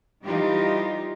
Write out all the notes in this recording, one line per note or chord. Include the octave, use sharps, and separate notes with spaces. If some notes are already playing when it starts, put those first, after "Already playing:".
E3 G3 D#4 F4 G4